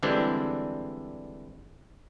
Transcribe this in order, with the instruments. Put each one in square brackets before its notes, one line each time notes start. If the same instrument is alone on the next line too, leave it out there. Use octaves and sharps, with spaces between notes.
[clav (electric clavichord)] D3 E3 G3 G#3 C4 D4